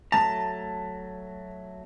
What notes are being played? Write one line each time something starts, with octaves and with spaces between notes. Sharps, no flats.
F#3 A3 A5 A#5